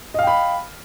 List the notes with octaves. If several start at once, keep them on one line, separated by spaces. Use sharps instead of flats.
D#5 F5 G5 B5